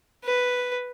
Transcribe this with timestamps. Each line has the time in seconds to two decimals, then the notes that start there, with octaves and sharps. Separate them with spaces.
0.24 B4